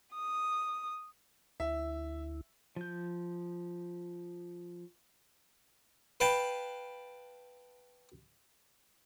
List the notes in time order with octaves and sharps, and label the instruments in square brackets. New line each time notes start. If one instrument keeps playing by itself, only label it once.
[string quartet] D#6
[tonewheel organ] D2 E4 [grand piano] E5
[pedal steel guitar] F3 G6
[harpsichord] B4 F5 G5 A5